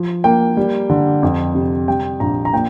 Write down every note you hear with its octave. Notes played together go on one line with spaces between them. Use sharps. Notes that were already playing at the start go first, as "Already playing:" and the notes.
Already playing: F3
A#3 G5
G3
D3
F2
C3
G3 G5
A#1 A#5
A#5
A#2 G5